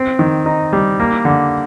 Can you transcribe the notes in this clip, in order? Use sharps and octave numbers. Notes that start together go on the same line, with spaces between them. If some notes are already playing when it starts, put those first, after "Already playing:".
Already playing: C4
D#3
D#4
G3
A#3
D3